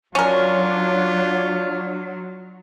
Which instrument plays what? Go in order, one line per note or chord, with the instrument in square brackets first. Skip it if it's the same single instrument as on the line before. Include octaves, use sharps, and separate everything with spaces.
[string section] F#3 [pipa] C#4 A#4 [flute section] D4 C#5 [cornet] F4